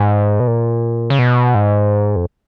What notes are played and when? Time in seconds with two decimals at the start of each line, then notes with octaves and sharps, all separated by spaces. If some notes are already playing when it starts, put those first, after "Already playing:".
Already playing: G#2
0.40 B2
0.47 A#2
1.10 C#3
1.19 B2
1.55 G#2
2.16 F2